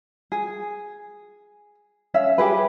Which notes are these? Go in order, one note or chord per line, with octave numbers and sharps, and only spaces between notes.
G#4
C#4 C#5 E5 F5
G4 G#4 B4